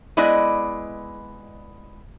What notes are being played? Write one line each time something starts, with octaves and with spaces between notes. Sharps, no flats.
G#3 B3 E4 D5 D#5